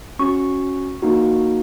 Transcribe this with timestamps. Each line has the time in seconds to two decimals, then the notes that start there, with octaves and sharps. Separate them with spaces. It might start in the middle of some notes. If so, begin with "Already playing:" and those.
0.19 C#4 F#4 C#6
1.02 A#3 D#4 F#4